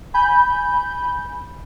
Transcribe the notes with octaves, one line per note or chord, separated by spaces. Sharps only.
G#5 B5 G6